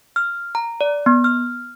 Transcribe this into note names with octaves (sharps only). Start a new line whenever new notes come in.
F6
A#5
D5
B3
F6